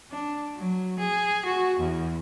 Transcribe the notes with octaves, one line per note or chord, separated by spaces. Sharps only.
D4
F#3
G#4
F#4
E2